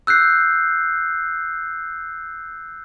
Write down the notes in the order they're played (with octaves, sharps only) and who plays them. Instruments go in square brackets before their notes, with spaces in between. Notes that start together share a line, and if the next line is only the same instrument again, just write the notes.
[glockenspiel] E6 F#6 G6 C7